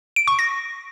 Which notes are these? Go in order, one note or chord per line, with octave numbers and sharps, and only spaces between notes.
D7
C#6
A#6